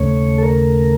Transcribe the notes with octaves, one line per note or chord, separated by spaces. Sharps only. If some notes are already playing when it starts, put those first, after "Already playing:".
Already playing: D#2 C#3 A3 C#5
A4
A#4